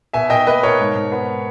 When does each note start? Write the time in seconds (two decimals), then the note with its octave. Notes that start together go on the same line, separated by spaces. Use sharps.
0.13 B2 E5 G#5
0.30 B2 D#5 G5
0.47 A#3 B4 D#5
0.63 B2 A#4 C#5
0.80 G#2
0.95 G#2
1.12 B3